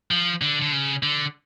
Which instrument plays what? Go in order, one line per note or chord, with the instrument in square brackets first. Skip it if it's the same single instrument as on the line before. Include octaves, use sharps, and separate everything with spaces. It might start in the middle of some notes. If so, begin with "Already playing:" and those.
[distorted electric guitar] F3
D3
D3
C#3
D3